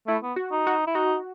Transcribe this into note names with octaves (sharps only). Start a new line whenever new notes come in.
A3 E4
B3
F#4
D#4
F#4
E4
D#4 F#4